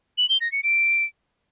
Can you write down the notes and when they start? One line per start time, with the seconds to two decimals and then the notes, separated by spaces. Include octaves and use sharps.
0.18 F#7
0.29 G7
0.41 A#6
0.52 C#7
0.64 D7